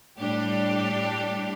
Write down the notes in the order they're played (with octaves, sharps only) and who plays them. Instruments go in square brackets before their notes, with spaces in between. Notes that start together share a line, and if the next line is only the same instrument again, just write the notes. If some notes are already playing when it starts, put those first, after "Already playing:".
[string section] A2 G3 D4 G4